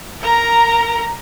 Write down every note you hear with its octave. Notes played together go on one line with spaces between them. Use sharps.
A#4 A#5